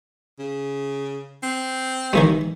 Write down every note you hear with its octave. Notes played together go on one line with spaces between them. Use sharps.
C#3
C4
D#3 E3 G#3